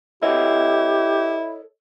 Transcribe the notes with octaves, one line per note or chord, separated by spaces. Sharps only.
E4 G4 A4 C#5 D#5